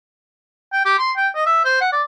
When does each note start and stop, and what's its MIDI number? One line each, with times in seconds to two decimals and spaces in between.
0.73 0.80 79
0.85 0.96 67
0.99 1.11 84
1.17 1.28 79
1.35 1.45 75
1.46 1.60 76
1.65 1.78 72
1.81 1.91 78
1.92 2.02 74